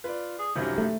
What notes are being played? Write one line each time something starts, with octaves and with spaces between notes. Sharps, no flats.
F4 B4 D5
G#4
C2 F#2 D#3 F3 F#3 G4
A3